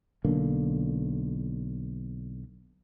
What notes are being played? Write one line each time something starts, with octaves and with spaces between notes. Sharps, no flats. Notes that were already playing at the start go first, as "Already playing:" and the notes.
B1 D3 A#3